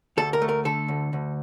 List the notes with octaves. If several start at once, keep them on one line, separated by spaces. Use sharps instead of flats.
D2 A4
A#4
A3
A#4
D3 A4
D2
D2